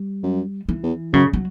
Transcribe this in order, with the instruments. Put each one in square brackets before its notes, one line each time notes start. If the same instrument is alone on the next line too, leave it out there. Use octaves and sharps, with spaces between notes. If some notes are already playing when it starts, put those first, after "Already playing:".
Already playing: [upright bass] G3
[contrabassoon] F#2
[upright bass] E3
[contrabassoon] E2
[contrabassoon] F#2 [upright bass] C#3
[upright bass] F#3